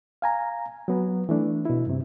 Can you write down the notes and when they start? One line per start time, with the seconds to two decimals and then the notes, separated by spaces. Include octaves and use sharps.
0.22 F5 G#5 A#5
0.88 F#3 B3
1.29 E3 A3 D4
1.65 B2 E4
1.87 G2 C3